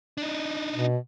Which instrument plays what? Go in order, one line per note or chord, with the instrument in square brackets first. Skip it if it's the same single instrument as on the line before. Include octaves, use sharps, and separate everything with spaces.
[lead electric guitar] D4 D#4
[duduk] B2